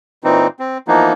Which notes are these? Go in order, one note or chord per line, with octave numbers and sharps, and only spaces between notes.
A#2 E3 C4 D#4
C4
E3 F3 A#3 B3 D#4